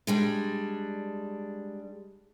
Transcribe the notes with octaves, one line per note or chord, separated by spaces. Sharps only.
G3 G#3 D4